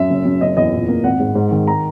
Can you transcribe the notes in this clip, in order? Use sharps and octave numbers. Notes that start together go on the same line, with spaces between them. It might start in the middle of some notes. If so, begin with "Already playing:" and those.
Already playing: F#2 E5
F#1
F#2
F#1 D#5
E2 D#5
A#2
A#3
G#1 F#5
G#2
G#2
D#3
A#5